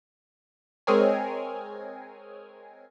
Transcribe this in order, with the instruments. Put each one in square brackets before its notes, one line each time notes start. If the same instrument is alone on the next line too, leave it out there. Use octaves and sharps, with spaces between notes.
[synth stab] G#3 C4 G#4 A#4 C#5 G#5